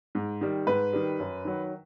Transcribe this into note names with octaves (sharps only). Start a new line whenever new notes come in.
G#2
D#3 G3
G#2 B4
D#3 G3
F#2
D#3 F#3